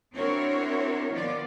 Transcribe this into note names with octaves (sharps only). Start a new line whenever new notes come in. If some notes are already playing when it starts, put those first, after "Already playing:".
C4 D4 E4 F#4 A#4 C#5
D#3 F3 B3 F4 D5